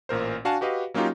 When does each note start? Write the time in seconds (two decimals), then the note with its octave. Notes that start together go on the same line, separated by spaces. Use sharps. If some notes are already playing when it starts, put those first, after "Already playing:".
0.09 A1 A#2 A#4 C5
0.45 D4 F#4 F5 G#5 A5
0.61 F#4 G4 B4 D#5 F5
0.94 F#3 A#3 C#4 D#4 F4 G4